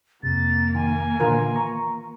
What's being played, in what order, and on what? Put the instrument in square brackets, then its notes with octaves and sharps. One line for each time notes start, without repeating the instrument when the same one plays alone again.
[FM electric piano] F2 C3 [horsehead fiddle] A#3 [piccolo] A6
[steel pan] D#3 [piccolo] G#5
[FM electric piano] A#2 D3 [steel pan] E3 F4 A#4
[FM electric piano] A#5 C#6